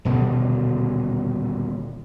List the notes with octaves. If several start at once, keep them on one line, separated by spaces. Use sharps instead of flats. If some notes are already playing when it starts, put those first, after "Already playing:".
D#1 B2 D3 G3